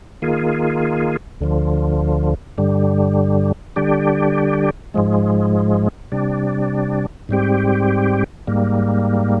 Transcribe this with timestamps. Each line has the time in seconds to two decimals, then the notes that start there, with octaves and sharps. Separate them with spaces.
0.22 D#3 A#3 F4 G#4
1.41 D2 D3 F3
2.58 G2 D3 G3
3.76 D3 G3 D4 G4
4.94 G#2 F3 G#3
6.12 C3 G3 D4
7.29 G#2 G3 C4 G4
8.47 G#2 G3 A#3